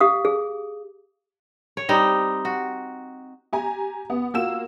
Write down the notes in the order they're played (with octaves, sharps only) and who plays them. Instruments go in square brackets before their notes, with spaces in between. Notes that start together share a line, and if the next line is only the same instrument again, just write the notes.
[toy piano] G4 F5 D#6
G#4
[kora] C#5
G3 C4 D#4
F#4
[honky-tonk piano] G4 G#5 A#5
B3
A#3 F4 F#4 E6 E7